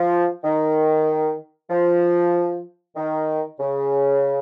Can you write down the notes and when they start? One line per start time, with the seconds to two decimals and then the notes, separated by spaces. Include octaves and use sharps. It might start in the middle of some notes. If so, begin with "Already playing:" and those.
Already playing: F3
0.44 D#3
1.70 F3
2.96 D#3
3.60 C#3